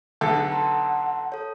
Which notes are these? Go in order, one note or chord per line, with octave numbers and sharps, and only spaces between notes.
B1 D3 A4
F#5 A5 A#5 C6
A4 C#5